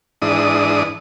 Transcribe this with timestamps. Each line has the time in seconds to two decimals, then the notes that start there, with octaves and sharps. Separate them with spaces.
0.22 G#2 E3 D4 D#6